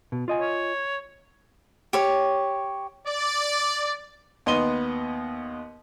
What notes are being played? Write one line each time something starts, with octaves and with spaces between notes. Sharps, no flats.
B2
F4 D#5 G#5
C#5
G4 C#5
D5
D#2 B3 D#5 C6 D#7 G7